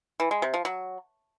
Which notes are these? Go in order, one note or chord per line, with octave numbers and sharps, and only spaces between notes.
E3
G#3
C3
F3
F#3